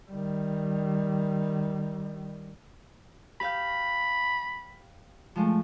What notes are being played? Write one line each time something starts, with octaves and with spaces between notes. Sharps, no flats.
D#3 G3
G4 F5 B5 G6
F3 G#3 A3